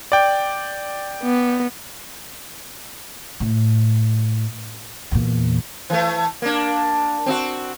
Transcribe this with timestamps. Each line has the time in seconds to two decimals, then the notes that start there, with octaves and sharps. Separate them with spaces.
0.12 D5 G5
1.23 B3
3.40 A2
5.11 E2 A#2
5.90 E3 A3
6.42 A#3 D4
7.26 C4 D#4 F#4